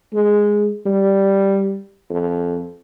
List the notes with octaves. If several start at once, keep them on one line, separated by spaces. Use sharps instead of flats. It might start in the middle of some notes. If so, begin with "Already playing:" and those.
G#3
G3
F2